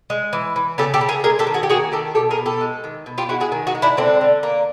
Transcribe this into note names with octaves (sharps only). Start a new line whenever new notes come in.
G#3
E3
E3
C#3 G4 A4
G4 A4
C#3
G#4 A#4
G#3 G#4 A#4
G4 A4
D#3
F#4 G#4
G4
A#3 F#4 G#4
D#3 G4 A4
B2 G4 A4
G#4 A#4
B2
G4 A4
G#3
D#3
B2
F4 G4
G#3 E4 F#4
F#4 G#4
D#3
F#4 G#4
G#3
D4 E4
D3 C4 D4
D3
A#3